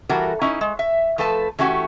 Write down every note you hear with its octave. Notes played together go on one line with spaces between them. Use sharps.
E3 G3 F#4 A4 A#4
C#4 D#4 E4
G#3
E5
F3 A3 A4 B4 A5
E3 A3 C#4 F#4 G4